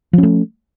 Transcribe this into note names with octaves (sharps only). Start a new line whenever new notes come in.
F3 A3 C#4